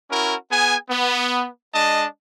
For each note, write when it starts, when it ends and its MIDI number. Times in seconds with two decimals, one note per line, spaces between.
0.10 0.35 61
0.10 0.35 64
0.10 0.35 66
0.10 0.35 70
0.51 0.75 59
0.51 0.75 68
0.51 0.75 80
0.90 1.48 59
1.74 2.06 56
1.74 2.06 62
1.74 2.06 75
1.74 2.06 81